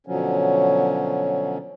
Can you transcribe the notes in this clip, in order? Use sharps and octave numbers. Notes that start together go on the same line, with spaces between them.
B2 D3 F3 F#3 C#4